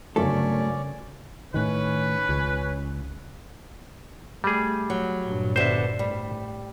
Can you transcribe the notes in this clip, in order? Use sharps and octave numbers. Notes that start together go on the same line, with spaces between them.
G1 C#3 F#3 A3 C#4 A4 A#4 D5
A2 D#3 C#4 B4
C#2
G3 A3 G#4
F#3
G2 A#2
B2 D3 C5 E5
A2 G3